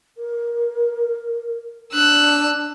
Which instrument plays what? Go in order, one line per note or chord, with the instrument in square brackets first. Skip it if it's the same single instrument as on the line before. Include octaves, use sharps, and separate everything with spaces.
[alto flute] A#4
[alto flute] D4 [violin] E6 F#6